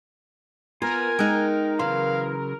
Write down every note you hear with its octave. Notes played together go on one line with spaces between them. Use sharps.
B3 F4 A#4 G#5
G#3 D#4 G5 F6 F#6
C#3 E3 F#3 F5 C6